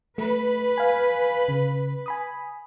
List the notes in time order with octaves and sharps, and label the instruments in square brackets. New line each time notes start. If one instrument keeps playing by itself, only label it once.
[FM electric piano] A3 [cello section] B4
[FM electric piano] F5 G#5
C#3
G#5 B5 D#6